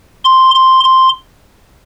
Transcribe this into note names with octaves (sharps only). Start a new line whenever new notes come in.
C6
C6
C6